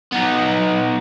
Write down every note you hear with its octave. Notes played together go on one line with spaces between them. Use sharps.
B3 D#4